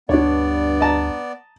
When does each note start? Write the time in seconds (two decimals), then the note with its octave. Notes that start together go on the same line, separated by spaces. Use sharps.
0.09 D2 G2 B3 D4 C#5 D5
0.81 D#5 A5 A#5